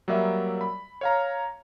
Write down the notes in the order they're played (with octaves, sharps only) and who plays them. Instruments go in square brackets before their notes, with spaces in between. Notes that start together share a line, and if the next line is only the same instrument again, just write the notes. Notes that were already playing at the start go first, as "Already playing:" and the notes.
[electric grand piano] F#3 G3 A#3 D5 E5
B5
C#5 F5 A#5